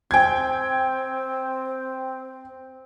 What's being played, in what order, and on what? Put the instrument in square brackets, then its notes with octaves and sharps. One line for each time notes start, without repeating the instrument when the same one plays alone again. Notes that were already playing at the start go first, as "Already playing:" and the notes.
[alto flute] C4 [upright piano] G5 G#6